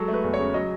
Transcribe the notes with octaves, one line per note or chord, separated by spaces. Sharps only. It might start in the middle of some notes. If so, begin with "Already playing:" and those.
Already playing: F#3 G#3 A4
A3
B4
E2
C#5
C#3
F#3 D#5